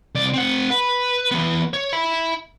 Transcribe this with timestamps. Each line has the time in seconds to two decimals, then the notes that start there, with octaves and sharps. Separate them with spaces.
0.15 C2 D5
0.34 C4 F#5
0.71 B4
1.31 E3 B3
1.73 C#5
1.93 E5 B5